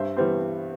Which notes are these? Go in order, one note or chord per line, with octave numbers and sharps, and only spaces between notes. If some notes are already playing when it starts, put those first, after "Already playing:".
Already playing: G2 C5 E5
E3 G3 B3 C5